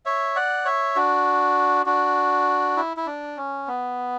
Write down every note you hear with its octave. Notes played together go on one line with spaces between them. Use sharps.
C#5 E5
D5 F#5
C#5 E5
D4 F#4
D4 F#4
E4
E4
D4
C#4
B3